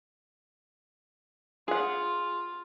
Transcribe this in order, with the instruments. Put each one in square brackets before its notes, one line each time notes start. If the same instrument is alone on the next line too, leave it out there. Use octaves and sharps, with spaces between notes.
[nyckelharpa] F4 [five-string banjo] G#4 F#5